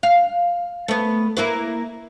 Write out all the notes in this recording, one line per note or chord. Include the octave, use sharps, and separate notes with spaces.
F5
A3 B3
A#3 E4 B4